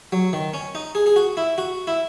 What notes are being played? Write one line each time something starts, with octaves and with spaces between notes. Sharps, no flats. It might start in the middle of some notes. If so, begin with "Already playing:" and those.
F#3
D#3
C#4
D#4
G#4
G#4
F#4
E4
F#4
E4